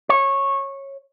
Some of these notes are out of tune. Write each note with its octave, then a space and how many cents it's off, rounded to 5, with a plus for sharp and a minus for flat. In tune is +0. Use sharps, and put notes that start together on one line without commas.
C#5 -15